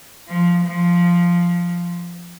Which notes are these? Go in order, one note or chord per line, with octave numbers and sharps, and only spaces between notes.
F3
F3